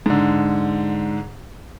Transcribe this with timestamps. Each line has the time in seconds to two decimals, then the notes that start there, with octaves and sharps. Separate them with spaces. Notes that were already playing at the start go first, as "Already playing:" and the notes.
0.06 G#2 D3